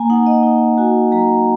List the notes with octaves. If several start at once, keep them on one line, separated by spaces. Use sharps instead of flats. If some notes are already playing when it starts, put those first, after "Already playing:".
Already playing: A#3 G#5 A#5
D#4 F#5
D#5
D#4
F#4 G#5
F#3 A#5